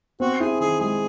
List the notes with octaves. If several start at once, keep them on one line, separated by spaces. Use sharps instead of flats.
C4 F#4
E4 G#4
D#3 G#4
G#3 G#4